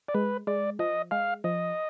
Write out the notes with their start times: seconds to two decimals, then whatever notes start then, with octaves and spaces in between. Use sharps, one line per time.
0.08 D5
0.15 G#3 B4
0.47 G#3 D5
0.79 F3 D#5
1.11 G#3 F5
1.44 F3 D#5